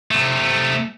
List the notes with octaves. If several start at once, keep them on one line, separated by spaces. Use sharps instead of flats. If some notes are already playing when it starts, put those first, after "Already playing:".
C3 A3